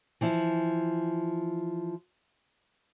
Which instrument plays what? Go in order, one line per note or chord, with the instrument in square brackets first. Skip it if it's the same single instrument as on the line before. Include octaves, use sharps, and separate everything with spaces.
[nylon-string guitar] E3 F3 E4